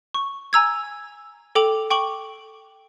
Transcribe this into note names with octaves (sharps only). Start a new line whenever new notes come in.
C#6
G#5 A#5 E6 G#6
A4 G5 D6 F7 F#7
G5 C#6 D6 F#7